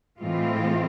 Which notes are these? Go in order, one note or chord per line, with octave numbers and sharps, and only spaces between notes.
A2 E3 G#3 C4 F4